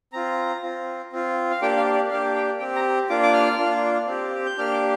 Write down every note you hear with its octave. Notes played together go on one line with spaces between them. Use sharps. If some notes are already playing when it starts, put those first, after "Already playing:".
C4 F4 A#5
C4 F4
C4 F4
F5
A#3 D4 G4 G5
F5
D5
A#3 D4 G4 F5
G5
C4 G4 G5
A#5
A#3 D4 F4 D6
D6
F6
A#3 D4 F4
C4 G4
G6
A#3 D4 G4 F6
D6